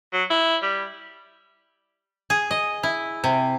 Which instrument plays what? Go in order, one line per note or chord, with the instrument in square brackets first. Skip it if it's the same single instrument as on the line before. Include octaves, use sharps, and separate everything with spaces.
[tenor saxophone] F#3
E4
G3
[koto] G#4
D#5
E4
C3